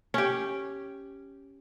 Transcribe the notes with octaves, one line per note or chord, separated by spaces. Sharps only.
C#4 G4